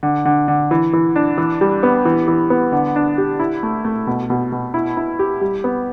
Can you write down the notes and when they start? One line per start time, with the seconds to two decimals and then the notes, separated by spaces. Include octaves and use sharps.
0.03 D3
0.25 D3
0.48 D3
0.71 E3
0.93 E3
1.16 D4
1.38 E3
1.61 G3
1.83 B3
2.05 E3
2.28 E3
2.50 B3
2.72 D3
2.96 D4
3.18 G4
3.39 E4
3.63 A3
3.85 A3
4.07 B2
4.30 B2
4.52 B2
4.74 E4
4.97 E4
5.19 G4
5.41 G3
5.64 B3